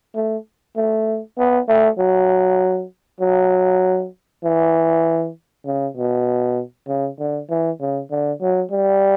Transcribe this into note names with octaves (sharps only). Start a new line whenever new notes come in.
A3
A3
B3
A3
F#3
F#3
E3
C#3
B2
C#3
D3
E3
C#3
D3
F#3
G3